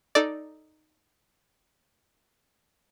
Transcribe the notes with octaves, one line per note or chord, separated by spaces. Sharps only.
D#4 A4 D5